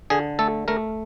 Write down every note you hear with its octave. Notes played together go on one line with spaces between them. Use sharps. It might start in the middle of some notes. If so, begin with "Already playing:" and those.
D3 G#4
A3 A4
A3 A#4